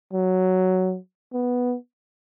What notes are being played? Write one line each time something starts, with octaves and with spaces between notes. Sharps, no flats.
F#3
B3